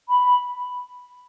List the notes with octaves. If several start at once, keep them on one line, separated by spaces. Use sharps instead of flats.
B5